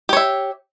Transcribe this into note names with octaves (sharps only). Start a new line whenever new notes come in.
G4 C#5 E5